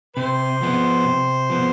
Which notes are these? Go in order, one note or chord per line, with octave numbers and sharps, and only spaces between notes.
C3 C5
F3 B3
C3
F3 B3